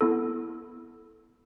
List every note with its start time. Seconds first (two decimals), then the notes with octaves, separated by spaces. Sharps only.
0.01 B3 E4 A4